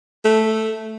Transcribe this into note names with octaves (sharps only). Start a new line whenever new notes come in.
A3